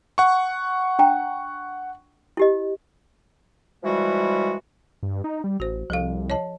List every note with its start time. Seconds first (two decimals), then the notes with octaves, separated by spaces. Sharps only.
0.18 F#5 C#6
0.99 D4 G5 A#5
2.37 E4 G4 D#5
3.84 E3 F3 G3 G#3 F#4
5.03 G2
5.24 D#4
5.44 G3
5.60 A1 F#4 C5
5.90 C2 F3 A4 F5
6.30 C#5 D#5 A5